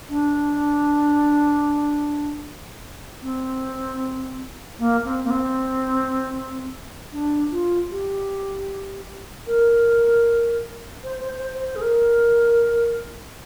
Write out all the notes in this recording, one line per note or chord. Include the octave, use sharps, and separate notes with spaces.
D4
C4
A#3
C4
A#3
C4
D4
F4
G4
A#4
C5
C5
C5
C5
G#4
A#4